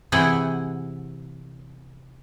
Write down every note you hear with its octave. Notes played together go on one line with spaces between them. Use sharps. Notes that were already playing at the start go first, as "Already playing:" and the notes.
C3 E3 E4 G#4 F#5 G5